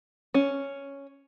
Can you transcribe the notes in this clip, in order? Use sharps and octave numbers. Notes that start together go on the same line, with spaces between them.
C#4